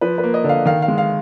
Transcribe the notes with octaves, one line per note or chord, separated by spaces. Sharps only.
F3 B4
B4
A#3
D#5
D3
F5
D#3 F5
F5
G#3
F5